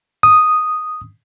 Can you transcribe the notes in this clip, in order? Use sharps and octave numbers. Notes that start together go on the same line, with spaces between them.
D#6